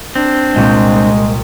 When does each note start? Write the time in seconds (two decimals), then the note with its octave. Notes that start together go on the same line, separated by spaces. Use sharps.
0.15 C4 D4
0.54 C2 A#2 G#3 G6